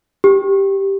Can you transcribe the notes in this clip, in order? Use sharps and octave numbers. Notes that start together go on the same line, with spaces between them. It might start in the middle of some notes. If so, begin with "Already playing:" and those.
G4